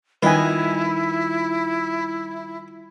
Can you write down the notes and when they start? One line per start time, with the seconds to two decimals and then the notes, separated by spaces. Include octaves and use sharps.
0.23 D#3 G3 E4 F4 B4 D#5 G#5